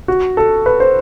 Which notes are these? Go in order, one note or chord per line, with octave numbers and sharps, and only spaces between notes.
F#4
A4
B4
C5